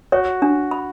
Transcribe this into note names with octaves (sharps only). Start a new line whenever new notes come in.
F#4 C#5
D4
B5